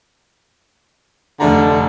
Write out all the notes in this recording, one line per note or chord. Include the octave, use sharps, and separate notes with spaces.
F1 D3 A3 A#5